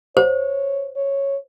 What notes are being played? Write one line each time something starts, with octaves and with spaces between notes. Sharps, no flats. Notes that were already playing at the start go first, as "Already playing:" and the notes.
C5 C#5
C#5